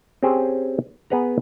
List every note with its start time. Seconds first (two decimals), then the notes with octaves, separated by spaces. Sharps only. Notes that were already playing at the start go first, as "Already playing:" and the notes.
0.23 C4 C#4 G4 G#4 C5
1.10 B3 G#4 B4 F#5 A#5